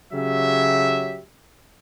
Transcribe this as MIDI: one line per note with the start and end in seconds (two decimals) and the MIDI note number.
0.13 1.20 49
0.13 1.20 54
0.13 1.20 67
0.13 1.20 76